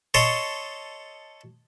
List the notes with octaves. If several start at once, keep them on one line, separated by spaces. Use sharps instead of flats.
A4 C#5 D#5 C6